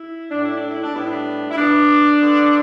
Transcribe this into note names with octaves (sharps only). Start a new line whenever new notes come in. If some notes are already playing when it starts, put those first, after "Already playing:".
Already playing: E4
A2 A3 D4
E4
D4
E4
D4
A2 G3 B3 E4
D4
E4
B2 B3 D4
D3 B3